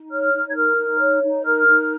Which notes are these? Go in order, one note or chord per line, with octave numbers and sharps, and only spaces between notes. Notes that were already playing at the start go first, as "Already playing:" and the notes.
Already playing: D#4
C#5 F6
D#4
G#6
A#4 F6
D#4
C#5
D#4
A#4 F6
D#4